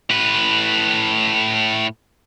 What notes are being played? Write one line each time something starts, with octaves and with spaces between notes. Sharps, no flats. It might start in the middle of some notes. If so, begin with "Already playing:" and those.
A2 B4